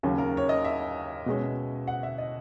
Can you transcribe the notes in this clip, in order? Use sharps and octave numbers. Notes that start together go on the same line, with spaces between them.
D#2 C#3 F#3 C#4
A#4
C#5
D#5
E5
B2 G#3 C#4
F#5
E5
D#5